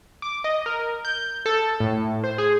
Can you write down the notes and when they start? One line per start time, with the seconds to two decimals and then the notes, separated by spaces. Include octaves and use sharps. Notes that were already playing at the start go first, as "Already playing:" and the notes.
0.22 D6
0.44 D#5
0.66 A#4
1.05 G6
1.46 A4
1.80 A2
2.24 C5
2.38 G#4